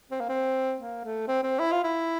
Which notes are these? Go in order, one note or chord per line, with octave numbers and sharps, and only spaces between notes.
C4
A#3
C4
A#3
A3
C4
C4
E4
F4
E4